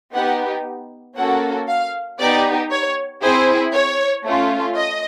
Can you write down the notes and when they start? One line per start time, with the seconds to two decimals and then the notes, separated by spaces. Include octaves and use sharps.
0.14 B3 D#4 G4 F#5
1.17 A#3 C#4 F#4 A4 F#5
1.68 F5
2.19 B3 D#4 G4 D5
2.71 C#5
3.22 C4 E4 G#4 C5
3.73 C#5
4.25 A3 C#4 F4
4.76 D#5